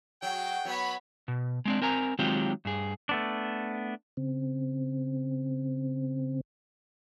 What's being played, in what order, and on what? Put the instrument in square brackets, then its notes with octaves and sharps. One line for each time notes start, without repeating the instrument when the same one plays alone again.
[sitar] F#3 [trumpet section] F#4 G#4 G5
[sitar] F#3 [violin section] B3 C#5 B5
[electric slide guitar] B2
G#3 C4 D4
C4 A#4 G#5 A#5
D#3 F#3 G#3 C4 F4 G4
G2 G#4
A3 B3 D4
[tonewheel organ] C#3 C4